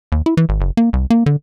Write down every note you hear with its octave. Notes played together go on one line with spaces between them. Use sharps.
D#2
E4
E3
G#1
F#1
A#3
C2
A#3
D3